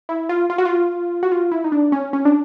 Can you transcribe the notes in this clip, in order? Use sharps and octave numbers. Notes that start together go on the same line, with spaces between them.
E4
F4
F4
F#4
F4
F#4
F4
E4
D#4
D4
C#4
C#4
D4